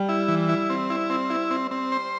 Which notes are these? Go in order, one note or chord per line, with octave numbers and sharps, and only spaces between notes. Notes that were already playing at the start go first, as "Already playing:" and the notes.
Already playing: G3
E4
E3
E4
C4
E4
C4
E4
C4
C4
C5